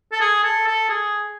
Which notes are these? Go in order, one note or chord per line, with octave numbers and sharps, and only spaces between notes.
A4
G#4
A4
A4
G#4